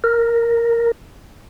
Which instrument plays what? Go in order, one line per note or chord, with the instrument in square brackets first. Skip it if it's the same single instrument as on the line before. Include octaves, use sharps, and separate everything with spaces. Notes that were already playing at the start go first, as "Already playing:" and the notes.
[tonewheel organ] A#4